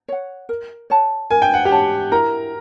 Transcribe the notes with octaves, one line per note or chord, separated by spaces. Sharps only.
C#5 F#5
A#4
C#5 F#5 A5
A#4 G#5
G5
F#5
G4 G5
C#5 F#5 A5
E4 A#4 A#5